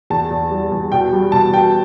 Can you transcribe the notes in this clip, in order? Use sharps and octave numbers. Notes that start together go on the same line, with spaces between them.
E2 A5
E2
G3
E2
B2 G5
G3
B2 A5
B2 G5